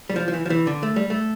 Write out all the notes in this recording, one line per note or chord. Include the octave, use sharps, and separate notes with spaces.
G3
F3
F3
E3
F3
E3
D3
A3
G3
A3